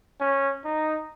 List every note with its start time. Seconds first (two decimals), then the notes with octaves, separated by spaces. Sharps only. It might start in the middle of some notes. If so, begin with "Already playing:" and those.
0.21 C#4
0.65 D#4